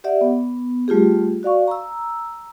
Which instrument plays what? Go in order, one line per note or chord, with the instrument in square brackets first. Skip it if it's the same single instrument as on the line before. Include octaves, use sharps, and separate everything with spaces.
[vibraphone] G4 D5 E5 F#5
B3
G3 A3 F4 G4 G#4
F#4 D5 F5 C#6
A#5 E6